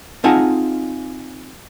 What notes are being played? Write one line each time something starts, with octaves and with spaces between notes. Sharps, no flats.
C4 D#4 F4 G#4 F#5 A5